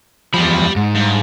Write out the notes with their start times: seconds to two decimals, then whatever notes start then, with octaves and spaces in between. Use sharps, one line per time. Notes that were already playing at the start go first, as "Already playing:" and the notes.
0.34 E2 F3 G4 B5
0.76 G#2
0.95 G2